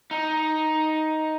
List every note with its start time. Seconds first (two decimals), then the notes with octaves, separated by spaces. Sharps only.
0.11 D#4